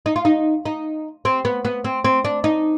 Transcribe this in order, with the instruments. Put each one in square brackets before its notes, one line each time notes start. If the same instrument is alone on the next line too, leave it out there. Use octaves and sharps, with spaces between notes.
[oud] D#4
F4
D#4
D#4
C4
B3
B3
C4
C4
D4
D#4